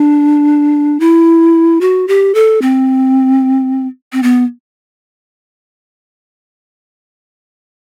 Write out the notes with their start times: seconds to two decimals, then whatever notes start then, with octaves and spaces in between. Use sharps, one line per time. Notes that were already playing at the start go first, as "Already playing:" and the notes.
Already playing: D4
1.00 E4
1.81 F#4
2.08 G4
2.35 A4
2.62 C4
4.13 C4
4.23 B3